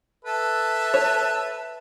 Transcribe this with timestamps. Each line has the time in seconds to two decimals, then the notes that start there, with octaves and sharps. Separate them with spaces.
0.25 A4 B4 E5 A5
0.94 C#5